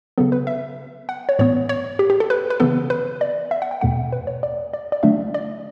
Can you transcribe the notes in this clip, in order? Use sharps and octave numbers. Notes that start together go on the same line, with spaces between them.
C#3 F#3 B3 A4
B4
E5
F#5
C#5
A2 E3 B3 C#5
C#5
G4
G4
A4
B4
B4
C#3 E3 B3 A4
B4
D5
E5
F#5
G5
E2 B2 A3 F#5
B4
C#5
D5
D5
D5
D3 F#3 A3 D4 E5
D5